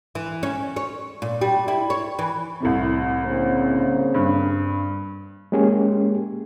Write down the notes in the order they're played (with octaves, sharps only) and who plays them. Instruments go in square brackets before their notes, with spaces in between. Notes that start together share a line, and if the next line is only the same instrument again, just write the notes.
[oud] E3
C#4
C#5
A#2
G3
E4
C#5
E3
[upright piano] C2 A2 C3
[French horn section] C#3 A#3 C4
[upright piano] G2
[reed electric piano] G#3 A#3 C#4 G4 G#4